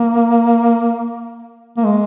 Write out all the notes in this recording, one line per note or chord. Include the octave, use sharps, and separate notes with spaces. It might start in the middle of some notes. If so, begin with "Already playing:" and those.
Already playing: A#3
A#3
G#3